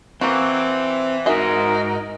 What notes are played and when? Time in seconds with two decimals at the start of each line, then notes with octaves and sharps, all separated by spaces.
0.21 E3 A#3 C4 F#4
1.26 G#2 D#4 F#4 G#4 A#4 D#5 E5